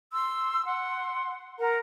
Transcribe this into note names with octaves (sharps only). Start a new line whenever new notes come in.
C6 E6
F#5 C6
A#4 F#5 A#5